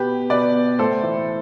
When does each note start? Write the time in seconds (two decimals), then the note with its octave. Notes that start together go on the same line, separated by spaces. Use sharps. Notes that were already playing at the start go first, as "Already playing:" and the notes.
Already playing: B2 G4 B4
0.30 B2 B4 D5
0.79 A2 A4 C5
1.03 E3